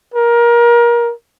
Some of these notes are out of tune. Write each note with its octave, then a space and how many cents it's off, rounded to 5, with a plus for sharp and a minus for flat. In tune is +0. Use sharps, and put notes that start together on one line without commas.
A#4 +25